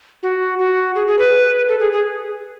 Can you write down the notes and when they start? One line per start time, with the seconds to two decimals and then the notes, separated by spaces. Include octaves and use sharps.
0.23 F#4
0.59 F#4
0.95 G#4
1.07 G#4
1.19 B4
1.68 A4
1.80 G#4
1.92 G#4